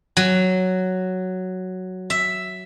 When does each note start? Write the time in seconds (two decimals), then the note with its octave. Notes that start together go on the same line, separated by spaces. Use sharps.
0.17 F#3
2.10 E5